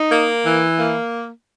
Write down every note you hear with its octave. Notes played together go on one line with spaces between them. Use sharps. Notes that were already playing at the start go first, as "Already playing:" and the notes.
Already playing: D#4
A#3
E3
A#3